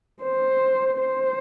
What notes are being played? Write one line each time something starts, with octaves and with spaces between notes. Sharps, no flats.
C5
C5